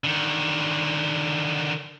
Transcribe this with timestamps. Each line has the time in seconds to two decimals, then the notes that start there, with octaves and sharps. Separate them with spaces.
0.04 D3 D#3